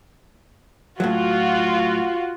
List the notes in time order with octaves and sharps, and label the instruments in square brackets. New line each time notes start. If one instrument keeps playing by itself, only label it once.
[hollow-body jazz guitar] A2 F#3 [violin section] F4 F#4